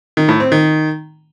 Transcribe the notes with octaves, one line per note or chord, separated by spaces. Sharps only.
D#3
A2
C4
D#3